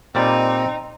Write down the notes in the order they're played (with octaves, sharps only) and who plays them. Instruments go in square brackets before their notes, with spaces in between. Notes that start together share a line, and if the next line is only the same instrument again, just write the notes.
[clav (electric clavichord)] A#2 G3 D5 [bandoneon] C4 [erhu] D#4